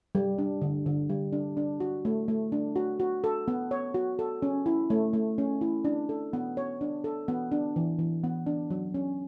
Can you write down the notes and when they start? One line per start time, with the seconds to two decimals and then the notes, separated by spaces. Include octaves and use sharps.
0.15 G3
0.38 D4
0.61 D3
0.86 D3
1.09 G3
1.33 D4
1.57 D4
1.80 F#4
2.05 A3
2.28 A3
2.52 D4
2.76 F#4
3.00 F#4
3.24 A4
3.48 B3
3.71 C#5
3.94 F#4
4.19 A4
4.42 C#4
4.66 E4
4.90 A3
5.13 A3
5.38 C#4
5.61 E4
5.85 D4
6.09 A4
6.33 B3
6.57 C#5
6.81 D4
7.04 A4
7.28 B3
7.52 D4
7.76 E3
7.99 E3
8.24 B3
8.46 D4
8.70 F#3
8.94 C#4